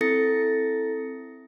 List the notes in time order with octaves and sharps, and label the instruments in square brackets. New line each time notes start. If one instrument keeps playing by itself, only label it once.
[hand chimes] C4 E4 A4 A6 A#6 C#7